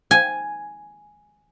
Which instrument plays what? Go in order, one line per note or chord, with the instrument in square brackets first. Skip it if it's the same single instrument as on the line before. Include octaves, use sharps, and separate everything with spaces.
[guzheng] G#5